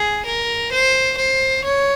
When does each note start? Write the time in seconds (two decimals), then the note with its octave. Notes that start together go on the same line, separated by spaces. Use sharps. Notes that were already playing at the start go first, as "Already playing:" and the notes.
Already playing: G#4
0.25 A#4
0.72 C5
1.18 C5
1.64 C#5